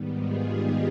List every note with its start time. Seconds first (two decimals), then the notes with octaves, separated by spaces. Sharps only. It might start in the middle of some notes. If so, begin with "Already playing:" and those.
Already playing: G#2 D#3 G3 B3
0.15 F4 G#4
0.46 D#4 G4